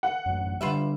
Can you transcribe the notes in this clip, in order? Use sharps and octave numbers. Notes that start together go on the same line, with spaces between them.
F#5
A1 F#2
D3 G3 F4 B4 E5